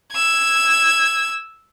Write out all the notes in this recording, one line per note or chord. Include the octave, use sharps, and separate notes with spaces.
E6 G#6